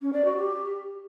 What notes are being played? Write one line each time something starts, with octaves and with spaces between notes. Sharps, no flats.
C#4
D5
F#4
G4